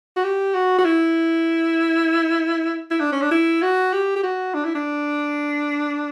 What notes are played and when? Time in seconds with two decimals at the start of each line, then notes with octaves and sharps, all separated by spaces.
0.17 F#4
0.24 G4
0.54 F#4
0.79 F#4
0.85 E4
2.91 E4
3.01 D4
3.12 C#4
3.22 D4
3.31 E4
3.62 F#4
3.93 G4
4.16 G4
4.24 F#4
4.54 D4
4.65 E4
4.75 D4